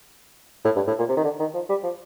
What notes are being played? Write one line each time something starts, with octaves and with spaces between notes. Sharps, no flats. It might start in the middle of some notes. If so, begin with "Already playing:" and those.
A2
G2
A2
A#2
C3
D#3
D3
D#3
F3
G3
F3